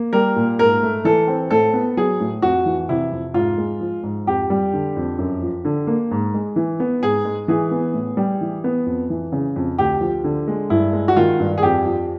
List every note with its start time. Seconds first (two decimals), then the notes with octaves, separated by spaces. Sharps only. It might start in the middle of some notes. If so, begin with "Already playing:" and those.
Already playing: A#3
0.13 G3 A#4
0.36 A#2
0.59 G#2 A#4
0.83 A3
1.05 E3 A4
1.28 C4
1.51 A2 A4
1.73 B3
1.97 F#3 G#4
2.20 A2
2.42 F2 F#4
2.66 E3
2.89 C3 E4
3.12 F2
3.34 G#2 F4
3.58 G#3
3.80 F3
4.03 G#2
4.27 F2 G4
4.50 G3
4.73 D3
4.96 F2
5.19 F#2
5.42 F3
5.65 D3
5.87 A#3
6.11 G#2
6.34 G#3
6.56 E3
6.80 B3
7.03 G#2 G#4
7.25 G#3
7.48 E3 G#4
7.71 B3
7.94 A2
8.17 G3
8.41 E3
8.64 B3
8.86 F2
9.10 E3
9.32 C#3
9.56 F2
9.78 D2 G4
10.01 F3
10.24 D3
10.48 G#3
10.70 G2 E4
10.93 G#3
11.08 F#4
11.17 D#3 F4
11.40 G2
11.58 G#4
11.63 F2 G4
11.86 F3